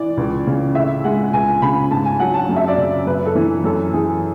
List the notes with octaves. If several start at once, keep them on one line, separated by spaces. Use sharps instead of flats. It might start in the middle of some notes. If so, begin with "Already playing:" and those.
Already playing: E3 D5
C#2
C#3
A2 E5
G#3 F#5
C#2 G#5
C#3 B5
G#2 A5
G#5
F#3 F#5
A5
F#2
E5
D5
C#3
F#2 B4
A4
E3
F#2 A4
E3 G#4